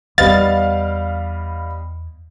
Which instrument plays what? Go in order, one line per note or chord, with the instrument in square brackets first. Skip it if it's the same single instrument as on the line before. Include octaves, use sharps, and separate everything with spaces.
[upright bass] E2 D#4 [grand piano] G3 B3 D#5 [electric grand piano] F5 [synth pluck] A6